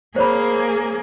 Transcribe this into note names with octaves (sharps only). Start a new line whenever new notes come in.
A#3 G#4 C5 C#5 B5